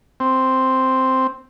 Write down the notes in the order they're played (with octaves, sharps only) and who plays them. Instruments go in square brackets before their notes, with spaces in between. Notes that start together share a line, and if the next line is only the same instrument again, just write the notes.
[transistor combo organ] C4